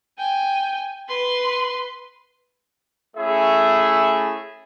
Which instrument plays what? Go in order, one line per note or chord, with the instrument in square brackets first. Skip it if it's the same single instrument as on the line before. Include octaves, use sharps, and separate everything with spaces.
[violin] G5 G#5
B4 C6
[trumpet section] A3 C#4 E4 G#4 E5